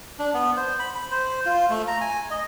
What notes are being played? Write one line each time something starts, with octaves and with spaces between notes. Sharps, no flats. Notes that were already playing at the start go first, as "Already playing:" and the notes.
D4
B3
C5
B5
B5
C5
F4
A3
A#5
G#5
D#5